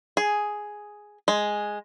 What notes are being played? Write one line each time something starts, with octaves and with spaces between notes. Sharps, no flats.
G#4
G#3